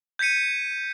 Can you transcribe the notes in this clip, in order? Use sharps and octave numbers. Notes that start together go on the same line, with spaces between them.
G6 G#6 B6 C#7 D#7